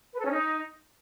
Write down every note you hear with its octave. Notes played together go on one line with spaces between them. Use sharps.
B4
A4
C#4
D#4